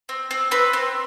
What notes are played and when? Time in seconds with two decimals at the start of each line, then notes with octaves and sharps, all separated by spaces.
0.09 C4
0.31 C4
0.51 C4 B4
0.73 C4